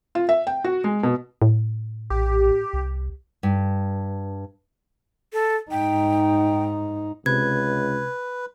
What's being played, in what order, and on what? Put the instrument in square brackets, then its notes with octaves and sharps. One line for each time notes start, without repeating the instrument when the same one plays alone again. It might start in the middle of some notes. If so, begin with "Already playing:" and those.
[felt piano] F4
E5
G5
F#4
G#3
B2
[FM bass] A2
[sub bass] A#1 [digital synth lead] G4
[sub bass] C2
[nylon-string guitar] G2
[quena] A4
[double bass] G#2 D#4 [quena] G5
[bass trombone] C#2 [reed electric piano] C3 [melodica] B4 [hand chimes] G#6